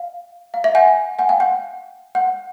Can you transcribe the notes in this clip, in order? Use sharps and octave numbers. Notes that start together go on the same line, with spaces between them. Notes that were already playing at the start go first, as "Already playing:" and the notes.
Already playing: F5
F5
E5
F#5 G#5
F#5 G#5
F5 G5
F#5
F#5